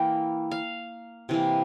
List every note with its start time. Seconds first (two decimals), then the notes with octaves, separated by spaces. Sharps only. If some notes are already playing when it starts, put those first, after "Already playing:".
Already playing: E3 A#3 G5
0.51 F5
1.29 C3 E3 A#3